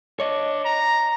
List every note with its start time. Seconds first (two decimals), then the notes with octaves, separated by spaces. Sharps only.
0.20 D4 C#5 D#5
0.65 A#5